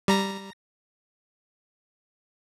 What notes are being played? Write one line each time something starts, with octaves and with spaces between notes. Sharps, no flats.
G3 A#5 A#6